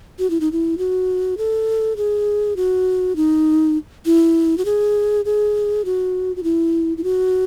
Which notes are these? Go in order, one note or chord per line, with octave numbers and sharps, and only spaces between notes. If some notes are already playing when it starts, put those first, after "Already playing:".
F#4
E4
D#4
E4
F#4
A4
G#4
F#4
D#4
E4
F#4
G#4
G#4
F#4
F#4
E4
E4
F#4